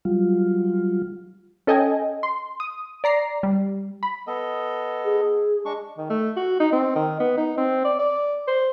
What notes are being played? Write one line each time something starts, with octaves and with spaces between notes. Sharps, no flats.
F#3 G3 F4
C#4 A4 D#5 G5 G#5
C6
D#6
D5 A#5 C7
G3
B5
B3 A4 D#5
G#4
G#3 D4 C#6
D#3
A3
F#4
D#4
C4
D#3
B3
D#4
C4
D5
D5
C5